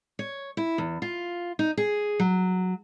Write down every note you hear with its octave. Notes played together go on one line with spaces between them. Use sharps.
C#5
E4
E2
F4
D#4
G#4
F#3